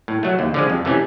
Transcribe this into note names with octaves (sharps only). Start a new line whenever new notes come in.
A2
F#3 A3
D#2
D3 F3 G#3
F2
C3 E3 A3 C#4